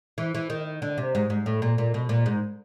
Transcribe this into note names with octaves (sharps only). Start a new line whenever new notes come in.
E3
E3
D#3
D3
C3
G#2
G#2
A2
A#2
A#2
B2
A#2
G#2